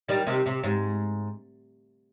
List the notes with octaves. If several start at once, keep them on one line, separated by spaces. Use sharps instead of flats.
D#3 G3
C3 D#3
C3
G#2